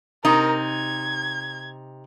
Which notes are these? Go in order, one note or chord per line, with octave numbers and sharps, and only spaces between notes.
C3 D#4 A#4
G#6